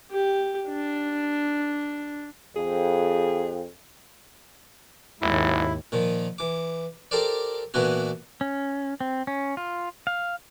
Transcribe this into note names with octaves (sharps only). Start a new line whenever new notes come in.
G4
D4
F2 G#4
F#1 D#2 G#2 E4
A#2 D#3 F3
E3 D6
G4 A4 A#4 C5 D5
A#2 E3 B3 D4 E4 F#4
C#4
C4
C#4
F4
F5